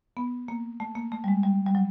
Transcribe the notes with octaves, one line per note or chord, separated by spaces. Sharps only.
B3
A#3
A3
A#3
A3
G3
G#3
G3
G3
F#3